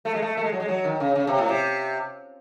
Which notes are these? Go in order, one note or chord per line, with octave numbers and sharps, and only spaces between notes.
A3
G#3
A3
A3
G#3
F#3
G#3
F#3
D#3
C#3
C#3
C3
A2
C3